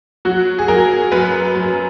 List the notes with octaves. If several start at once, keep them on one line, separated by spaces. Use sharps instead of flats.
F#3 F#4
G#4
F#3 A#4
F#2 B4
F#2